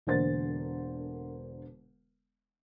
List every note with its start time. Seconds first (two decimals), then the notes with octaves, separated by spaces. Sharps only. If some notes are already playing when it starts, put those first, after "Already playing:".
0.07 E1 D3 A#3 C5 A6